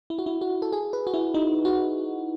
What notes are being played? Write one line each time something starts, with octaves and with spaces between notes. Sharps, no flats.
E4
F#4
E4
F#4
A4
G#4
B4
F#4
E4
D#4
F#4